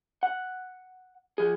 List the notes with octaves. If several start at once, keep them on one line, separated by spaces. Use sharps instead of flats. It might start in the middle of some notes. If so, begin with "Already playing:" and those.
F#5
F3 G#4